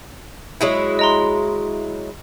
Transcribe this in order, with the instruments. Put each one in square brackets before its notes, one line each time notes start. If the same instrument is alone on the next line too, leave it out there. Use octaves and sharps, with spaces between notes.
[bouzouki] F#3 G#3 E4
[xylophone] D#5 A#5 C6